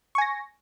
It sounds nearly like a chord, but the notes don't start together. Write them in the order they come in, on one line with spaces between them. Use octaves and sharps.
C#6 G#5 A#6